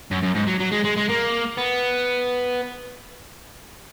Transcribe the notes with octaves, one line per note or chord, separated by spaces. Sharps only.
F#2
F#2
G#2
F#3
F#3
G#3
G#3
G#3
A#3
B3